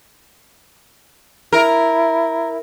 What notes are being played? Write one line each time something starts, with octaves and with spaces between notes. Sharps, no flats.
E4 A#4